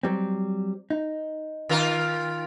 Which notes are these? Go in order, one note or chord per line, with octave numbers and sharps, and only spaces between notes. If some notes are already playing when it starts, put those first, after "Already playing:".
F#3 G3 C4
D#4
D#3 F4 A#4